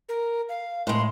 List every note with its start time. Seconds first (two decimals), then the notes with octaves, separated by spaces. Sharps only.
0.09 A#4
0.49 F5
0.87 A2 G#3 C6